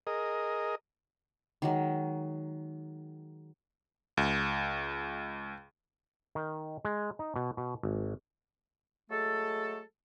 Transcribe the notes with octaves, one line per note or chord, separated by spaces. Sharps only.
G#4 A#4 D#5
D#3 F#3 G#3
C#2
D#3
G#3
D#4
B2
B2
G#1
F#3 G#3 A3 A4